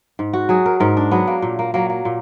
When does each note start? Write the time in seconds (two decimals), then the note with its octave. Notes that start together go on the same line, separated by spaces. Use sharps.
0.19 G#2
0.33 F#4
0.49 F#3 G#4
0.66 A#4
0.80 G#2 A#4
0.97 D4
1.11 F#3 B3
1.27 A#3
1.42 A#2
1.59 A#3
1.74 F#3 A#3
1.90 A#3
2.05 A#2